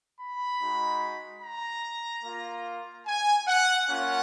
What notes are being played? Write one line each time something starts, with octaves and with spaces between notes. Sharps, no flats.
B5
G#3 D#4 F#4
A#5
A#3 F4
G#5
F#5
A#3 C#4 F4 F#5